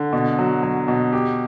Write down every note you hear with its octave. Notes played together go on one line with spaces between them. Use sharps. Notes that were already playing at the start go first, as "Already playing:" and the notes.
Already playing: D3
B2
F#3
F#3
B2
G4